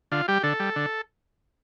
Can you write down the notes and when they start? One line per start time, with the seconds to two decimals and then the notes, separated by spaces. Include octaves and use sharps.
0.12 D3 F4
0.28 G3 G4
0.43 D3 A4
0.60 G3
0.76 D3